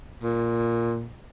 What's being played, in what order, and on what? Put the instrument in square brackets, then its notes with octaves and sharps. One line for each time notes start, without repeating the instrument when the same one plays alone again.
[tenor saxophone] A#2